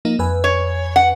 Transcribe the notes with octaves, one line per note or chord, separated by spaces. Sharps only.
F3 A#3 D#4
F2 B4 G#5
C#5
F#5